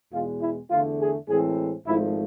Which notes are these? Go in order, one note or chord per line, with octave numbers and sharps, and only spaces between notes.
E2 B2 G#3 F4
E4
E2 D3 A3 F4
G#4
A2 E3 G#3 C4 G#4
G#1 G#2 F3 A3 E4